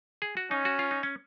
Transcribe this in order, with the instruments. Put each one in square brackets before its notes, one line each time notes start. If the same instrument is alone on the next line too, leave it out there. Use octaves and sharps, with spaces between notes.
[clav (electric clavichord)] G#4
F#4
[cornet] C#4 [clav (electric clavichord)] D#4
[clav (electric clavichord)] F#4
F4
D#4
C#4